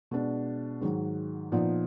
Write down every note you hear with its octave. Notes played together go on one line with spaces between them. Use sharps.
B2 G#3 D4
G#2 D#3 F#3
A#2 F3 B3 D#4